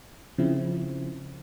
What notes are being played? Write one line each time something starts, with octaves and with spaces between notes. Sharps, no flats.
C#3 F3 C4 E4